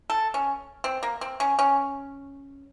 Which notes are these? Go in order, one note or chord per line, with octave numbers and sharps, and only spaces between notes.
A4
C#4
C4
A#3
C4
C#4
C#4